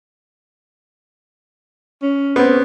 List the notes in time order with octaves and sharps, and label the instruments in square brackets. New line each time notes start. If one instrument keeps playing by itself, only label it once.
[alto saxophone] C#4
[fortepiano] B3 C4